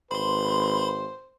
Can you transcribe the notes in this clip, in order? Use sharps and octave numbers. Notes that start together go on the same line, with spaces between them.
G#1 B4 C5 B5 C6